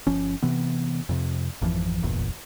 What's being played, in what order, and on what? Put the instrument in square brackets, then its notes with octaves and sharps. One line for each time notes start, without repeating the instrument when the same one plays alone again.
[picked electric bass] G1 F3 C#4
C3 E3 B3
F2 C3
G#1 F2 E3 F3
D1 G1 E2 A#2